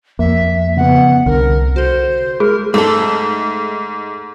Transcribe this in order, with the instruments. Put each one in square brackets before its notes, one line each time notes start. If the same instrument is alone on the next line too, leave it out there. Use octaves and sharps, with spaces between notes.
[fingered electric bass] F2 [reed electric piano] A#3 [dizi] E5
[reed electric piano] C#3 B3 [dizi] F#5
[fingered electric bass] C2 [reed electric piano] D3 [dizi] A#4
[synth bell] F#4 A4 [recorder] C5
[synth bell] G#3 [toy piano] G#4 [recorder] A#4
[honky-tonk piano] G#2 [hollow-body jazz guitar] A3 A4